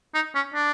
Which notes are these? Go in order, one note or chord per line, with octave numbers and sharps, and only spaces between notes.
D#4
C#4
D4